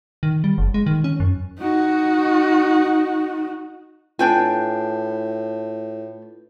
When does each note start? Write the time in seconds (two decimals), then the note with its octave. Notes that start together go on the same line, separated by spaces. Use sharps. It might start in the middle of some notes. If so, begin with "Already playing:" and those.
0.23 D#3
0.44 G3
0.58 F#1
0.74 G#3
0.86 D#3
1.04 C#4
1.20 F#2
1.59 D#4 F#4
4.19 A2 D4 F4 B4 G5 G#5 G6